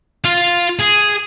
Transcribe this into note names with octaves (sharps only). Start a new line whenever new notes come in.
F4 F5
G#4